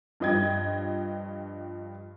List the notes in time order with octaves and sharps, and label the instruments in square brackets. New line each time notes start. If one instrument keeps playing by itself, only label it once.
[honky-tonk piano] G2 F3 D#5 G5 G#6